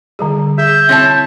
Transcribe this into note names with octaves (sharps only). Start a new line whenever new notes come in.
D3 G3 G#4
G#4 E5 G6
C4 E4 C#5 A5